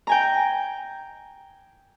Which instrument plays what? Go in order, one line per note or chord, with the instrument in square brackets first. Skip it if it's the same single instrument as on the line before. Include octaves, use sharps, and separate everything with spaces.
[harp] G5 G#5 A#5